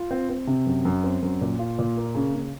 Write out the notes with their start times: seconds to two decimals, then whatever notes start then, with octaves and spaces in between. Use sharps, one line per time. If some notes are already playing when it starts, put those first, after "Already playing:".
Already playing: F4
0.11 C4
0.30 C4
0.47 C3
0.66 F#2
0.85 F#2
1.04 C4
1.23 F#2
1.41 A#2
1.59 F4
1.79 A#2
1.97 A#3
2.15 C#3
2.34 C#3